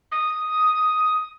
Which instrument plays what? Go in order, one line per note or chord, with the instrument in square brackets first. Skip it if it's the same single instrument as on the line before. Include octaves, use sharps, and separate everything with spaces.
[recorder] D#6